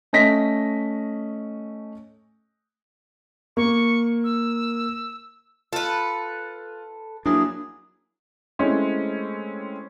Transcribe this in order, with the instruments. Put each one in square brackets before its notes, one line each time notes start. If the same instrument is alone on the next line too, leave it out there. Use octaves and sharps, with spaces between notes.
[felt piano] A3 C#4 D#5 A#6 B6
[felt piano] A#3 [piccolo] C#6
[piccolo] E6
[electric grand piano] F4 [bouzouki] A4 B4
[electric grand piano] F#3 A#3 E4 [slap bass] D4 [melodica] G#4
[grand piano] G#3 A3 C4 C#4 E4